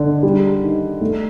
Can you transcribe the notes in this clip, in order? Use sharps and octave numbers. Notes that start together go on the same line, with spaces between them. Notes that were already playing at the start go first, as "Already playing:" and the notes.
Already playing: D3
G3
D#3
A3